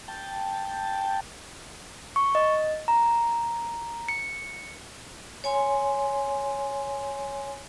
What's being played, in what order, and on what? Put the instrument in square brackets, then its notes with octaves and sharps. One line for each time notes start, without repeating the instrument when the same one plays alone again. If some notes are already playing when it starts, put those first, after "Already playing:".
[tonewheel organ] G5 A5
[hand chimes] C#6
D#5
A#5
C#7
[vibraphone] C#5 G#5 C6